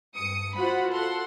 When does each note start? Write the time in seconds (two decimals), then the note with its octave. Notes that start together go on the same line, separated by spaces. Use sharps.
0.16 G2 D#6 C#7
0.58 F4 F#4 C5 F#5 B5
0.94 A4 F#5 C6